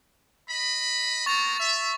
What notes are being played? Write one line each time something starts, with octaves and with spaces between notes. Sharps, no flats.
D#5 B5
A#3 B3 A#5 C#6 A6 F7
E5